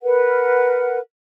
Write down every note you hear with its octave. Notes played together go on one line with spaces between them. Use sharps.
A#4 B4 F#5